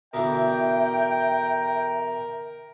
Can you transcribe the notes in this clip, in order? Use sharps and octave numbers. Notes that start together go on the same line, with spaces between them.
B2 D3 E3 A#4 E5 G5